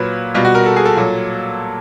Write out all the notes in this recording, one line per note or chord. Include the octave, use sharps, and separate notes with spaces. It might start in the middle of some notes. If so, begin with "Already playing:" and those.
Already playing: A#2 F#3 B4
B2 G3 F4
F#4
A#4
A4
G#4
A4
A#2 F#3